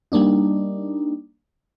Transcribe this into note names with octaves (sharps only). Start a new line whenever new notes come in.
G3 A#3 D4 D#4